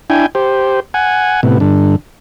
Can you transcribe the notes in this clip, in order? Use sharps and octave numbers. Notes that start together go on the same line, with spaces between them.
D4 E4 G5 G#5
G4 C5
F#5 G#5
A2 C3 B3
G2 D3